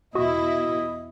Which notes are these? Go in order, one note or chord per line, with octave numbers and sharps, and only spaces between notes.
E2 B2 E4 F#4 D#5